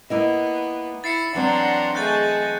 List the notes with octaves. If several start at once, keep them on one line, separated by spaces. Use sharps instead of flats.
A#3 B3 E4 D#5
E4 A6 C7 C#7
E3 F#3 C4 D4 F#5 A#5 C6
A3 G#4 D#5 A5 F#6 G6 A6